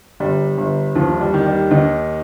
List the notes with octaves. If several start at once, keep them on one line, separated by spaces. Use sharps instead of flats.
G1 G3
G1
D#2 F3
G3
D#3
G3
D#2 D#4